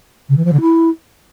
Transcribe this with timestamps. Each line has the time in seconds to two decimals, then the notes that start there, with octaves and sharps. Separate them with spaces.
0.29 C#3
0.37 E3
0.45 F3
0.53 D3
0.60 E4